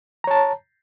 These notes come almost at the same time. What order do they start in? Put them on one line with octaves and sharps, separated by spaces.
A#5 C#5 A5